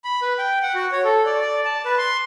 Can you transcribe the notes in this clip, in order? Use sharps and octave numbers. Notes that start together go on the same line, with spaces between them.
B5
B4
G5
F#5
F#4
C#5
A4
D5
D5
A5
B4
C6